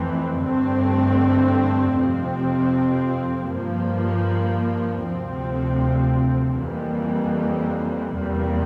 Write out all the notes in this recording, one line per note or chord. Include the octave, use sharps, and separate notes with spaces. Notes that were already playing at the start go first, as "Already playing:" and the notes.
Already playing: F2 E3 A3 C4
G2 D3 A3 C4
F2 C3 F3 C4
G2 F3 A#3
D2 C3 F3 C4
F2 E3 G3 A#3
E2 C3 G3 A#3